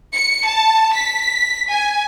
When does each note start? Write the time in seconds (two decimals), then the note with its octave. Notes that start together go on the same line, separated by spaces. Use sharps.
0.13 C#7
0.46 A5
0.94 B6
1.71 G#5